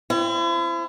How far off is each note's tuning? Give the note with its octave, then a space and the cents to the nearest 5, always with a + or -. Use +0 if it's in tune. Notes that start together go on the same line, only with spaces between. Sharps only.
C4 +0 E4 +40